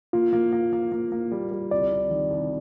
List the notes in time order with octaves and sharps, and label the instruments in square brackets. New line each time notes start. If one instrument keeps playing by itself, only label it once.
[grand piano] A#3 [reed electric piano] F4
[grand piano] A#3
A#3
A#3
A#3
A#3
G3
G3
[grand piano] C2 [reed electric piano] D5
[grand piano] C3
D#3
C2